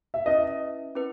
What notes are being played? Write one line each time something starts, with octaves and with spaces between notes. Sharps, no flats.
E5
C#4 E4 B4 D#5 E5
C#4 E4 B4